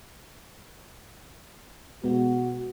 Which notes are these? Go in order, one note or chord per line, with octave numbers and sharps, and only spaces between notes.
B2 G#3 B3 F#4